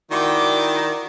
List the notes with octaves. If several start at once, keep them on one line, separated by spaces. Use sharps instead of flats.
D#3 E4 F#4 D5 G5 D6